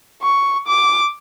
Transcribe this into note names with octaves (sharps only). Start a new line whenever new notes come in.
C#6
D6